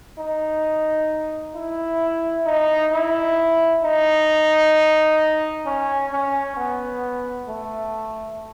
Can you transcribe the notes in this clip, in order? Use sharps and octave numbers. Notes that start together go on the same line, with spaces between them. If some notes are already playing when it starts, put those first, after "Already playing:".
D#4
E4
D#4
E4
D#4
C#4
C#4
B3
A3